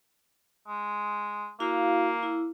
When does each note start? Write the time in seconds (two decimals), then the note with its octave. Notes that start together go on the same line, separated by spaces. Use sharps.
0.67 G#3
1.60 A#3 E4 F#4 F5
2.23 E4